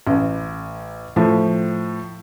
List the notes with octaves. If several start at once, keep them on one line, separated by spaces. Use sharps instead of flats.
A1
A2 F3